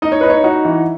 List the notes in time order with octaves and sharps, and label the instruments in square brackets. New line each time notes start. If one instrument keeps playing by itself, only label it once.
[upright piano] D#4 [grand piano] D#5
[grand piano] C#5
[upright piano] D#4 [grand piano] B4
[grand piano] C#5
[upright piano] D#4 [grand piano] F#4
[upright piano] E3